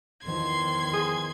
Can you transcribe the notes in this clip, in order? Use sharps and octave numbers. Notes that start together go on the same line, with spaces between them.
E2 D#3 F3 C6 G#6
G#4